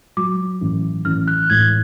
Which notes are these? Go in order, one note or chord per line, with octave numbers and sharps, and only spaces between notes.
F#3 D6
A1
A1 F6
F#6
A2 G#6